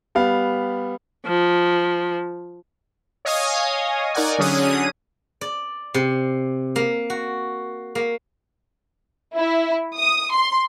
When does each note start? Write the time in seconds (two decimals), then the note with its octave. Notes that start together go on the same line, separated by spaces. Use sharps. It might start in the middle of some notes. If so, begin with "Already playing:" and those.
0.15 G3 B3 F5
1.26 F3
3.25 C#5 D#5 F5 G#5 D#6
4.14 D#4 A#4 D5 F#5 G#5
4.39 D3 F#3 C#4 G#4 D#6 D#7
5.41 D5
5.94 C3
6.76 A#3
7.10 F#4
7.95 A#3
9.36 E4
9.96 D#6
10.32 C6